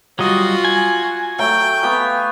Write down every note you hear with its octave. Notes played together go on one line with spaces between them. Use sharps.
F#3 G3 F4 F#4 D#5
G#5
F#3 A3 G5
B3 G4 F5